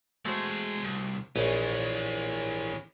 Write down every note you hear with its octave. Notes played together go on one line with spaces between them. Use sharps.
E2 G#3 A3 F#4 C5
C2
A#1 E3 C#4 C#5